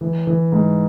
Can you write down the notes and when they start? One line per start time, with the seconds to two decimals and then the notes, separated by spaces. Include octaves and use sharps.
0.01 E3
0.27 E3
0.52 G#2